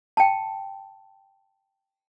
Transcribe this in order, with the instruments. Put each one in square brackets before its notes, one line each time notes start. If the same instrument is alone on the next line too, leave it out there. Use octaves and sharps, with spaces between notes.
[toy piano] G5 A5